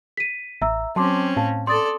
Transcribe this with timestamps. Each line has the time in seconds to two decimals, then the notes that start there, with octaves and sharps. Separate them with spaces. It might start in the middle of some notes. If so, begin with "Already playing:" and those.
0.17 B6 D#7
0.62 A1 E5 A#5 E6
0.96 F#3 C4 C#4 A5 C6 D6
1.37 A2 F5 A5
1.67 A4 D5 C6 D#6 A6